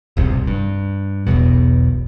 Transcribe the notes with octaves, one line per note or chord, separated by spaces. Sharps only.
E1 C#2 G2 C3
G2
E1 B1 E2 B2